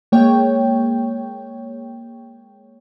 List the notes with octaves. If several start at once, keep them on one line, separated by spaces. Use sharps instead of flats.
G#3 A#3 C#5 G5